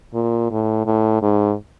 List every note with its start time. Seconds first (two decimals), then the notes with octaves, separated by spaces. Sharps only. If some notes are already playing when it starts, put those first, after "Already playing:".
0.14 A#2
0.51 A2
0.86 A2
1.22 G#2